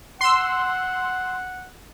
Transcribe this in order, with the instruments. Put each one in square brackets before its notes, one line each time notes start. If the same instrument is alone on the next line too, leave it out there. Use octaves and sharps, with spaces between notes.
[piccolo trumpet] F#5 [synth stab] C6 E6